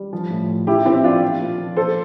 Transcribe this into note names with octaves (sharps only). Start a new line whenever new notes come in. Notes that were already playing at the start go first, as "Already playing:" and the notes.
Already playing: G3
F3
A2
F3
F3 E4 G4
A#2 C4 E4
F3 D4 F4
F3
A#2
F3
F3 A4 C5